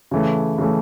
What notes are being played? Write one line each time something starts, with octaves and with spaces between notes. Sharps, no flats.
C#3 E3 A3
C#3 E3 A3